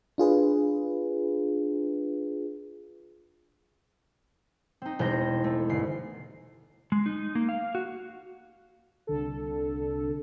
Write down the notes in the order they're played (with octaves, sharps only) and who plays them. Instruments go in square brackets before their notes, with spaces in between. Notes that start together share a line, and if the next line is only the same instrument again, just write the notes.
[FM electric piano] D4 F4 G#4 B4
[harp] C4 D#4
E1 C5 G6 A#6
A3
G1 C7
[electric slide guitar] G#3
D#4
A#3
F5
F#4
[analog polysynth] C2 D3 A4